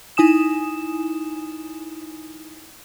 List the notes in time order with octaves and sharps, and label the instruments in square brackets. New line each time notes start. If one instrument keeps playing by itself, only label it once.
[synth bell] D#4 E4 G#5 D#6 E7